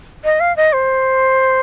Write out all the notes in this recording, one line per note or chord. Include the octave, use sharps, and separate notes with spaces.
D#5
F5
D#5
C5